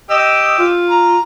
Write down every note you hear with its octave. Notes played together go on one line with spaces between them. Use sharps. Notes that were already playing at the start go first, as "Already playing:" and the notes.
G4 D#5 E6
F4
A#5